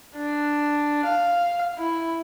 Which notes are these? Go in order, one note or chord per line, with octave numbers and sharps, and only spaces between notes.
D4
F5
E4